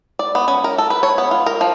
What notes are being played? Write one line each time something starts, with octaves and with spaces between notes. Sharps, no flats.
D5
B3
C#4
A#4
A4
B4
C#5
B3
F4
A#4
F3